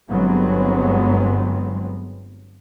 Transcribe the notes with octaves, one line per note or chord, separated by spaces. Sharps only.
G1 G2 F#3 G#3 B3 C4